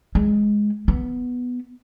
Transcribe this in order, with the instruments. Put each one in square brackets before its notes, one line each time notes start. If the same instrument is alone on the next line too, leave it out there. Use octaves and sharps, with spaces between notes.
[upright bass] G#3
B3